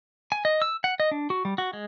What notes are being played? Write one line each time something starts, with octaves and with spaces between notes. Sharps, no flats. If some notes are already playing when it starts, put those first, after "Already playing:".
G#5
D#5
E6
F#5
D#5
D4
F#4
G3
F#4
G#3